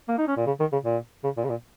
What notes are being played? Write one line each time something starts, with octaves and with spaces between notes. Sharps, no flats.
A#3
D#4
C#4
A#2
C#3
D#3
C#3
A#2
C#3
A#2
C#3
A#2